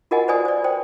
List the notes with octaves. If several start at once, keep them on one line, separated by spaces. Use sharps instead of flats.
F4 F#4 A#4 D#5 F#5 G#5
B4 C5 D5 G#5 D#6
C5 D5
C5 G5